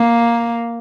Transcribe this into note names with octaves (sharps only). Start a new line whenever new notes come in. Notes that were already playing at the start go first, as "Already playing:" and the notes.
Already playing: A#3